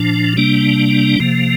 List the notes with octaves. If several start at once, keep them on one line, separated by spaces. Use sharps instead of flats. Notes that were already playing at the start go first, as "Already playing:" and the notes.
Already playing: A#2 F3 D4
C3 G3 A#3 D4
C3 F3 A#3